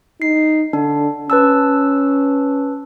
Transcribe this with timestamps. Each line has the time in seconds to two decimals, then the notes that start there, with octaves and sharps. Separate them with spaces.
0.22 D#4 C7
0.73 D3 D4
1.30 C#4 B4 A5 E6